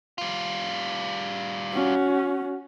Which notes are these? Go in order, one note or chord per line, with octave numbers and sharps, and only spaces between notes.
G3 F4
C#4 F#4